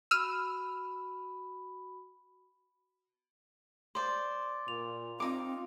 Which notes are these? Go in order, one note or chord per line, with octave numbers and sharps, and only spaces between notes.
F#4 B5 E6 F6 D#7
C5 D5 C6
A#2 F7
C4 D#4 F4 D6